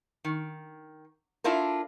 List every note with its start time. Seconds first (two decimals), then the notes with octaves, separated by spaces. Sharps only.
0.25 D#3
1.44 D4 E4 F4 A4 A#4